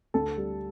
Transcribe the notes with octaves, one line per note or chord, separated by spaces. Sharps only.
D2 A4
G3